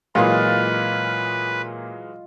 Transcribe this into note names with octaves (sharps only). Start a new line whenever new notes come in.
A#2 E3 F#3 G#3 F4 B4 D#5